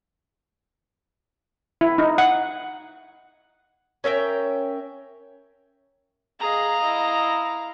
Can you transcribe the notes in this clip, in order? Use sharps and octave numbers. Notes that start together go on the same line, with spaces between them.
E4
D#4
F#5
C#4 A#4 E5 G5
G#4 D#5 F5 A#5
E4 D#5